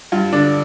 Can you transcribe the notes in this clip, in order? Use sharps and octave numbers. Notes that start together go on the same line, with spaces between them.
G2 F4
D3 D4